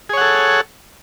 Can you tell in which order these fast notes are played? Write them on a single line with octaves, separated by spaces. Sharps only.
G#4 C#5 F#5 A4